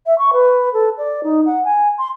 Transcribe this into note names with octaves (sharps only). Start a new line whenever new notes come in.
E5
C#6
B4
A4
D5
D#4
F#5
G#5
C6